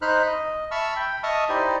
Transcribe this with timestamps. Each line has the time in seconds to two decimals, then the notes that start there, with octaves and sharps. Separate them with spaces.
0.02 D#4 C5 B5 F6 F#6
0.26 D#5
0.71 E5 A5 B5 C#6 E6 F6
0.96 G5 B5
1.23 D#5 E5 A5 C#6 D#6 F6
1.49 D#4 E4 G4 C5 D5 D#5